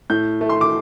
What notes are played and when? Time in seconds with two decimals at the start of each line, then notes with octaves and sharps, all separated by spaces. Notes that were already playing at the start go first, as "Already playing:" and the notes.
0.10 A2 G6
0.41 A3
0.49 C6
0.61 D6